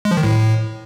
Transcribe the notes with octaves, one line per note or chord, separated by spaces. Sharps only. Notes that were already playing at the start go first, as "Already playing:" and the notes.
G#3
F3
D#3
A2